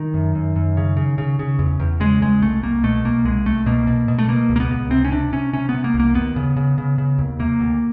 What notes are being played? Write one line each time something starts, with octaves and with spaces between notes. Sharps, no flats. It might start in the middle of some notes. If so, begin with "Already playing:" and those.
Already playing: D#3
F#2
F#2
F#2
C#3
C#3
C#3
C#3
E2
E2
C#3 G#3
E2 G#3
C2 A3
C2 A#3
B2 A3
C2 A#3
C2 G#3
C2 A3
B2 A#3
B2
B2
A3
B2 A#3
C#2
A#3
B3
C#2
C3 C4
C#4
C3 D4
C3 C#4
C3 C#4
B3
C3
A#3
C2
A#3
D#2 B3
C#3
C#3
C#3
C#3
D#2
C3 A#3
D2